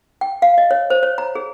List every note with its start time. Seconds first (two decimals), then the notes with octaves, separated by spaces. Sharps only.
0.21 G5
0.42 F5
0.58 D#5
0.71 C#5
0.90 C5
1.03 C#5
1.18 A#5
1.35 G#4